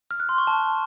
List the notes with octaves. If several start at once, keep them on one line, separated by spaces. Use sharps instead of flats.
F6
F#6
C6
C#6
A5